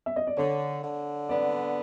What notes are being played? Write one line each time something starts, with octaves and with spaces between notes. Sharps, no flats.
E5
D#5
D5
D3 C#5
D3
B3 D5